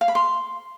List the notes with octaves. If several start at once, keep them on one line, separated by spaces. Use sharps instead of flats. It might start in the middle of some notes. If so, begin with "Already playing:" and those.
F5
B5
C6